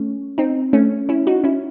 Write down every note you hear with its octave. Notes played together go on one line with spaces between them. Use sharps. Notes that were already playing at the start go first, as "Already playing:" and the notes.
Already playing: A3 C#4
C4 D#4
A3 C#4
C#4 E4
D#4 F#4
C#4 E4